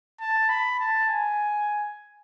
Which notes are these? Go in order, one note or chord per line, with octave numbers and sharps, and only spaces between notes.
A5
B5
A5
G#5